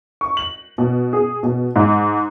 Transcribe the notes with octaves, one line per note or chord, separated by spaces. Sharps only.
C#6
F#7
B2
G#4
B2
G#2